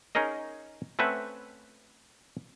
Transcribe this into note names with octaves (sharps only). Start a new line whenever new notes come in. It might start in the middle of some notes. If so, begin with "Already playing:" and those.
C#4 D#4 G#4 A#4 D#5
A3 C4 C#4 B4 E5 F#5